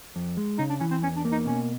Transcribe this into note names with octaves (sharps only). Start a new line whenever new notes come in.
F2
G#3
C#3 D#4
D4
E3 C#4
C4
E2 C#4
D4
A#3
D#4
B2 C#4